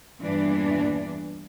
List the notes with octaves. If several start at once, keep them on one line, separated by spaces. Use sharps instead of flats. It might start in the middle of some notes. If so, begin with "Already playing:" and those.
E2 G2 A#2 E3 D4